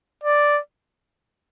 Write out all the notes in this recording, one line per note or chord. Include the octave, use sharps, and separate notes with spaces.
D5